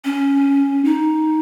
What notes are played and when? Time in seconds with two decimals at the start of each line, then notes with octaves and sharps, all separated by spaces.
0.05 C#4
0.85 D#4